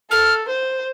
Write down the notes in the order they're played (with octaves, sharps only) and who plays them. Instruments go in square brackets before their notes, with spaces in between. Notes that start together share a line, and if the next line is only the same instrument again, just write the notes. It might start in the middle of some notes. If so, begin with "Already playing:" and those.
[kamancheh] A4 [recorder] F6
[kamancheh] C5